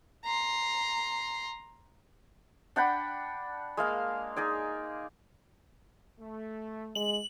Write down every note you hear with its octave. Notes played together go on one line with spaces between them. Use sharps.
A#5 C6
D4 F#5 G5 B5
G#3 A#3 F5
D#4 G#4 D5
A3
G#3 F#7